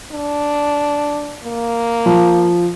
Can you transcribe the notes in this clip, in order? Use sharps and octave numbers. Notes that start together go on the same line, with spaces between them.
D4
A#3
F3